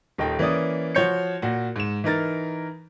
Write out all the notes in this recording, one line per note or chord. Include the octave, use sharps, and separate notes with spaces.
D#1 D#3 D#4 A4 G5
E3 A#3 C#4 D5 D#6
F3 F#4 C#5 G6 C#7
A#2 F#4
G#2 E7
E3 D#4 A#4 A6